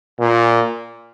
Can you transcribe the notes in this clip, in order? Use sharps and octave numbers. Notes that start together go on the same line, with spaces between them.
A#2